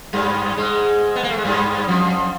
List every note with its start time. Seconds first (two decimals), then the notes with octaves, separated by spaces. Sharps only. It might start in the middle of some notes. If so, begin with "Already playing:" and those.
0.13 G2 G3
0.57 G#2 G#3
1.15 B3
1.23 A#3
1.31 A3
1.37 G#3
1.45 G2 G3
1.88 F2 F3